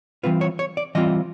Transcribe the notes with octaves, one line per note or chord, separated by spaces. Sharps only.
E3 G3 C4 F4 B4
C#5
C#5
D5
E3 G3 C4 F4 D#5